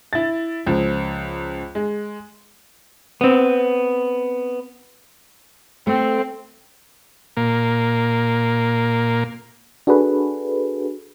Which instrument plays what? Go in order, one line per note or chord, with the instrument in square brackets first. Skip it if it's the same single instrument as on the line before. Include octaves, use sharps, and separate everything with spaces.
[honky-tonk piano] E4 A6
C#2 F3
G#3
[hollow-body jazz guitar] B3 C4
[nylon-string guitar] A3 [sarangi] C4
[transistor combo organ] A#2 A#3
[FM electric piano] D4 F#4 G#4 A4 B4